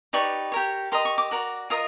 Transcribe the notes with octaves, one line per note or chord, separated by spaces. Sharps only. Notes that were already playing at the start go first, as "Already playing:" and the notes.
D#4 G4 B4 D5 C#6
G4 A#4 C#5
G4 A#4 D#5 C6
C#6
D6
F#4 A#4 D5
F4 A#4 D#5 D#6